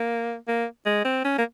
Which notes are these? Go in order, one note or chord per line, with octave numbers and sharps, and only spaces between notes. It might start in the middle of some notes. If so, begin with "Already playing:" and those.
Already playing: A#3
A#3
G#3
C4
C#4
A#3